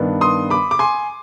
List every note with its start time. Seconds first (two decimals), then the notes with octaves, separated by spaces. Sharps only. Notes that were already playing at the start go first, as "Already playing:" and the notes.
Already playing: G2 D#3 B3 D4
0.21 C6 D#6
0.50 B5 D6
0.71 D6
0.79 G#5 C6